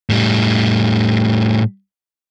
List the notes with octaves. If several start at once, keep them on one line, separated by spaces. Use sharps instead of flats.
A2 G3